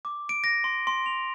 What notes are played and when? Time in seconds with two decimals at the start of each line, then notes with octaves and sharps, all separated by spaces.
0.05 D6
0.29 D7
0.44 A#6
0.64 C6
0.87 C6
1.06 F7